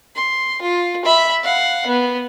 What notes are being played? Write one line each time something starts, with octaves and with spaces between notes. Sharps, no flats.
C6
F4
E5 B5
F5 F#5
B3